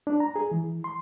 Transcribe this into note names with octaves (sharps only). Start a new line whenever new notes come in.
D4
A#5
G#4
E3
C6